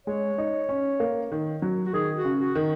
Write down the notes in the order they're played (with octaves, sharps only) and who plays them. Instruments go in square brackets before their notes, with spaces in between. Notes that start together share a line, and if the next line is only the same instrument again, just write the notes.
[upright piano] G#3 [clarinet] C#5
[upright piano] D#4
C#4
A#3
D#3
F#3
[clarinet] F#4
[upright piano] D#3 [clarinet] G#4
[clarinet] F#4
[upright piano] C#3
[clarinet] F#4
[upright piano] D#3